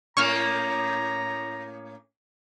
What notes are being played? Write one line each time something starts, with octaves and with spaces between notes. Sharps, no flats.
A2 A#3 C#4 A#5 C#6 F6